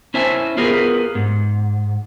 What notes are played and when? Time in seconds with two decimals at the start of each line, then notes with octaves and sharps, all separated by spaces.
0.14 C#4 E4 C5 E5 G#5 A5
0.57 B3 F4 G4 G#4 A#4 B4
1.15 G#2